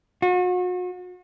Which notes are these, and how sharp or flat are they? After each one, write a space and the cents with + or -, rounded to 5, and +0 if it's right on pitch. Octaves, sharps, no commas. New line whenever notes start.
F#4 -40